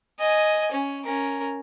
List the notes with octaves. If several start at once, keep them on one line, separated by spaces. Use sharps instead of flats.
D#5 G#5
C#4
C#4 A#4